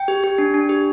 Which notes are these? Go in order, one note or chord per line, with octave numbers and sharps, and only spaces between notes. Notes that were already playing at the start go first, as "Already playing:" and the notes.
Already playing: G5
G4
G4
D4
D4
G4